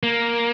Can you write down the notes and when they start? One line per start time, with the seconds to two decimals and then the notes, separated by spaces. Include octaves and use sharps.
0.03 A#3